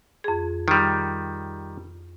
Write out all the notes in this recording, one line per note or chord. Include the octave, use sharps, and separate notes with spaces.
F2 G#4
D#3 G3